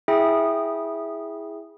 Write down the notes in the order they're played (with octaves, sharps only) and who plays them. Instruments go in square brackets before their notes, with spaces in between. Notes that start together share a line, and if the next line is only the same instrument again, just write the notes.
[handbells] E4 G#4 E5 G5 D#6